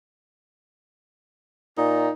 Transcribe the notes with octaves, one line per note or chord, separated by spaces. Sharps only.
A#2 D#4